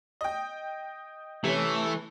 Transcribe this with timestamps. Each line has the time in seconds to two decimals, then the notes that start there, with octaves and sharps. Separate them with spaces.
0.21 D#5 G5
1.44 C3 E3 A3 C#4